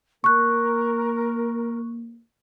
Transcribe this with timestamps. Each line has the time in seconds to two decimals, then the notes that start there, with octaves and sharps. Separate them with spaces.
0.24 A#3 A#4 C#6 F#6